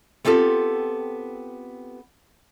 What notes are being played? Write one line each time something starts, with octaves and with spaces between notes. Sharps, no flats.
B3 C4 F4 G4 A4